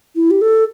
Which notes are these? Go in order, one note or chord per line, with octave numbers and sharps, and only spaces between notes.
E4
G4
A4